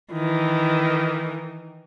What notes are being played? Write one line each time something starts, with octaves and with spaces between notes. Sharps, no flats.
D#3 E3